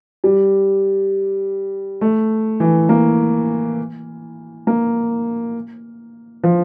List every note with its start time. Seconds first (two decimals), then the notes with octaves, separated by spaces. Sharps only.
0.24 G3
2.01 A3
2.60 E3
2.89 A#3
4.67 A#3
6.44 F3